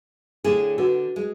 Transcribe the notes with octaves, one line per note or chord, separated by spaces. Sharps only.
A2 D3 G#4
D3 F#4 B4 F#5
G#3